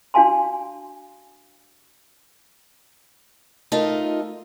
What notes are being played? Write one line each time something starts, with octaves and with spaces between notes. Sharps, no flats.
D4 F#4 F5 G#5 A5 C6
A3 D#4 F4 A#4 D#5